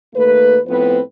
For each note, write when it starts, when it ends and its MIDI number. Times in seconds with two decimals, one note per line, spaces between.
0.14 0.58 39
0.14 0.58 57
0.14 0.58 58
0.14 0.58 71
0.66 1.00 45
0.66 1.00 53
0.66 1.00 59
0.66 1.00 60
0.66 1.00 71